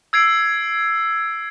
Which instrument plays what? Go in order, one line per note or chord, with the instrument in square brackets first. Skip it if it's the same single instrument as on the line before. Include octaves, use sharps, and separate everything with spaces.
[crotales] E6 G#6 C7 D7